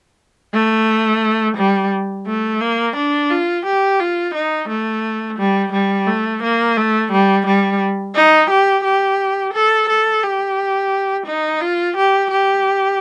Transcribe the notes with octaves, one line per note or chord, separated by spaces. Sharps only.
A3
G3
A3
A#3
D4
F4
G4
F4
D#4
A3
G3
G3
A3
A#3
A3
G3
G3
D#4
G4
G4
A4
A4
G4
D#4
F4
G4
G4